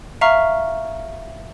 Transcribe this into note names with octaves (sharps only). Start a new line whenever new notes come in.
E5 F5 A#5 C#6 F6